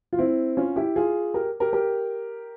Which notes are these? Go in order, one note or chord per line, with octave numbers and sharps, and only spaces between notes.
F4
C4 E4
C#4 F4
E4 G4
F4 G#4
G4 A#4
G4 A#4
G4 A#4